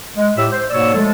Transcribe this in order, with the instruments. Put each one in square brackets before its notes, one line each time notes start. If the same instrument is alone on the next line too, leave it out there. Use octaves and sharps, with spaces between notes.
[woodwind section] G#3
A2 G4 E5 E6
C5
G#2 B2 A#3 C#5 D5 E6
F3 G#3 A3 A4